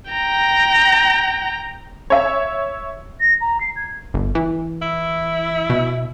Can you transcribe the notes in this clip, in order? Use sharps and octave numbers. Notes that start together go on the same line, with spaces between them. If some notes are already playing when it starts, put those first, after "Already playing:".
G5 A#5
C#5 E5
A#6
A#5
C7
G#6
G1
E3
E4
B2